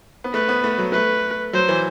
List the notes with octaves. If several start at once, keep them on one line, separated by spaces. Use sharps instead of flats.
B3
A3 B4
B3
A3
F#3
A3 B4
F#3 C5
E3